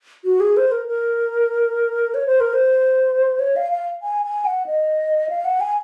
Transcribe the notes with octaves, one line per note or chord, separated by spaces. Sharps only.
F#4
G#4
C5
A#4
A#4
C#5
C5
A#4
C5
C#5
F5
F5
G#5
G#5
F#5
D#5
F5
F#5
G#5